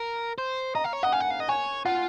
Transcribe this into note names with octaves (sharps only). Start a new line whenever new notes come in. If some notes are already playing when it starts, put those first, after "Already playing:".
Already playing: A#4
C5
D#5 A#5
F5
C#5
D#5 F#5
F5 G#5
F#5
F5
D#5
C#5 G#5
F4 F#5